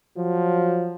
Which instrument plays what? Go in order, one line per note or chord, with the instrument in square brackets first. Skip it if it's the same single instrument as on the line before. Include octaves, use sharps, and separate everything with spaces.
[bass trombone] F3 [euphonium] F#3